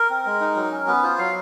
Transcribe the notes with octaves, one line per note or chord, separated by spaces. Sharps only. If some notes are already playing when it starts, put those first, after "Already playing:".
Already playing: A#4
C4
G#3
D#4
F#3
C#4
B3 B4
F4 C5
F#3 F5